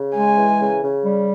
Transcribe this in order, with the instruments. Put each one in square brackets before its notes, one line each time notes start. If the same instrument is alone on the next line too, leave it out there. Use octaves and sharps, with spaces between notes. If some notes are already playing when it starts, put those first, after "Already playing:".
Already playing: [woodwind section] C#3
[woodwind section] G#3 [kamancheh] G#5
[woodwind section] E3
C#3
C#3
G3